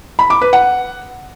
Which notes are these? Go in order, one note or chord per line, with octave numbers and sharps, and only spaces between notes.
B5
D6
B4
F#5